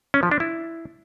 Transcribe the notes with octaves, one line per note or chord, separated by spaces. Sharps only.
C#4
F3
D4
E4